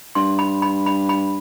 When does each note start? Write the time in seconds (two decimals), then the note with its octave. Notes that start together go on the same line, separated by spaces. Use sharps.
0.15 G2 C6
0.39 B5
0.62 B5
0.86 B5
1.09 B5